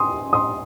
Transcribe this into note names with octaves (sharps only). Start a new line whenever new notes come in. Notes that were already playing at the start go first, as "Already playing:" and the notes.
Already playing: G#5 C6 D#6
C6 D#6